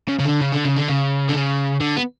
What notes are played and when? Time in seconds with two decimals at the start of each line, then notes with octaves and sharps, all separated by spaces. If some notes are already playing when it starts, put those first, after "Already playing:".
0.08 C#3
0.19 C#3
0.25 D3
0.40 C#3
0.52 D3
0.65 C#3
0.77 D3
0.89 C#3
1.29 D3
1.34 C#3
1.81 D3
1.97 B3